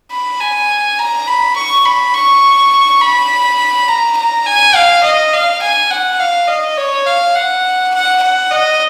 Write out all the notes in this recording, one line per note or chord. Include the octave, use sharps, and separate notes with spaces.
B5
G#5
A#5
B5
C#6
B5
C#6
B5
A#5
A#5
G#5
F5
D#5
F5
G#5
F#5
F5
D#5
C#5
F5
F#5
F#5
F#5
D#5